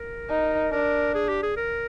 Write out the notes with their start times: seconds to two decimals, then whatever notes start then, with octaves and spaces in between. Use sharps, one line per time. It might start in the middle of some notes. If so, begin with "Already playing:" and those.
Already playing: A#4
0.29 D#4
0.72 D4 A#4
1.14 G#4
1.29 G4
1.43 G#4
1.57 A#4